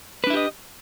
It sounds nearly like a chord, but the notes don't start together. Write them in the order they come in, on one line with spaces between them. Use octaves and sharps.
B4 D4 E4 G4 D#5